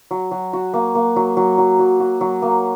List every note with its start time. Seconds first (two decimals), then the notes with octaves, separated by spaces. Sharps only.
0.11 F#3
0.31 F#3
0.53 F#4
0.73 A#3
0.95 A#3
1.16 F#3
1.37 F#3
1.58 F#3
1.79 F#3
2.00 F#4
2.21 F#3
2.42 A#3